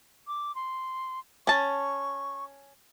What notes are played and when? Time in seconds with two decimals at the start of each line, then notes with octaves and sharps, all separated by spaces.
0.27 D6
0.55 C6
1.47 C#4 A5 C#6